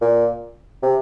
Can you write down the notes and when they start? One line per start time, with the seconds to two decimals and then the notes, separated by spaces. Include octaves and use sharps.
0.01 A#2
0.83 C3